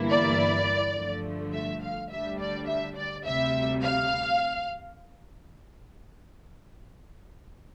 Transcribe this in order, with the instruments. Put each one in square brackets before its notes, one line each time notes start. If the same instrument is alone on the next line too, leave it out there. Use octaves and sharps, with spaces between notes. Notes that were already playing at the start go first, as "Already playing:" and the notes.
Already playing: [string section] G1 G2 E3 A#3 E4
D5
G2 D3 F3 A3
E5
F5
D2 D3 G3 D4 E5
D5
E5
D5
D2 C3 G3 E5
F5